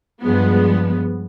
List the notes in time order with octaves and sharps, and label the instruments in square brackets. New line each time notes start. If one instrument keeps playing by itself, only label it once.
[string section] G2 F3 G#3 B3